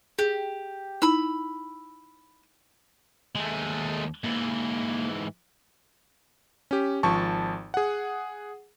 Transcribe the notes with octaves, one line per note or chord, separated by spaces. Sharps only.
G4 G#4
D#4 E4 B5 E6
D#2 G#3 A3 G#5
G#2 E3 A#3
C#4 G4
G#1 F3 A5 C#6
G#4 F#5